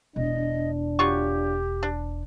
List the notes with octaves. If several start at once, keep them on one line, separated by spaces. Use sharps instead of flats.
E1 D4 D#5
F#3 F4 G4 C#6
D4